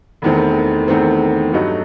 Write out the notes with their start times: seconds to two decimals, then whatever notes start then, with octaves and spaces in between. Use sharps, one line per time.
0.22 E1 E2 D#3 A3 C4
0.88 E1 E2 D#3 A3 C4
1.53 G2 F#3 A3 D#4 F#4